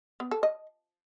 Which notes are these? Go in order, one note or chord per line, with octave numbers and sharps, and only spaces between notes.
B3
A4
D#5